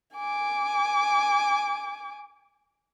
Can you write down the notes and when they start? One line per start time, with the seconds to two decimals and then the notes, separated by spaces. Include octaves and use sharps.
0.16 G#5 D6